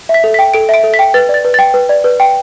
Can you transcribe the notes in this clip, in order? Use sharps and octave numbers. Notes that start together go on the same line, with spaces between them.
E5
B6
A4
B6
G5
A4 D7
E5 D7
A4
B6
G5
B4 A6
D5
A6
B4
G5 A6
B4
D5
B4
G5